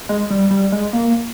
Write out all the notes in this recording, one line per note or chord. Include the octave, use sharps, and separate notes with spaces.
G#3
G3
G3
G#3
A#3